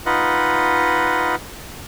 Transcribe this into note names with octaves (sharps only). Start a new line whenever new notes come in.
D#4 F4 B4 D#5 F#5